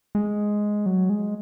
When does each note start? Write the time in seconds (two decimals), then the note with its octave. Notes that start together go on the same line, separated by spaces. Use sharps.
0.15 G#3
0.86 F#3
1.09 G#3